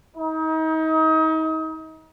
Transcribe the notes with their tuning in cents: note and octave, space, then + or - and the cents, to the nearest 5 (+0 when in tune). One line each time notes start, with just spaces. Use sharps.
D#4 +35